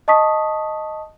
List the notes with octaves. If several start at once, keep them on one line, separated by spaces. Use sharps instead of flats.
D#5 A5 C#6 D#6 B6